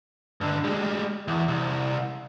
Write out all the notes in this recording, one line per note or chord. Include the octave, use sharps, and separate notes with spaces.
G2 D3
G3 G#3
E2
C2